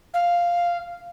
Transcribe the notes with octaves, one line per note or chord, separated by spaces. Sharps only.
F5